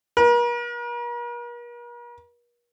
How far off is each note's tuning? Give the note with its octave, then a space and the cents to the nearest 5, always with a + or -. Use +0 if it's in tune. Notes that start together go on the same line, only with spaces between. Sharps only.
A#4 +45